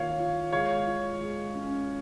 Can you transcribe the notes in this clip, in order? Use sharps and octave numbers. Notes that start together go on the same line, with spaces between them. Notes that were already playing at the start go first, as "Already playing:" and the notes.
Already playing: D#3 A#3 F4 C#5 F5
F4
G#3 C#5 F5
F4
G#3
C#4